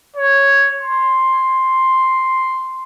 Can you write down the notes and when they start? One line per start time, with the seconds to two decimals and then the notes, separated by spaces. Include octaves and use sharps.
0.16 C#5
0.80 C6